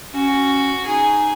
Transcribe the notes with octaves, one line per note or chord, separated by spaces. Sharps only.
C#4 F#4
D#4 G#4